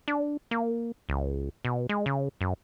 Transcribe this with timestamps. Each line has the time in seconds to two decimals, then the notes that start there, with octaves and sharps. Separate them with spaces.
0.08 D4
0.51 A#3
1.09 C#2
1.65 B2
1.89 G#3
2.06 C#3
2.41 F#2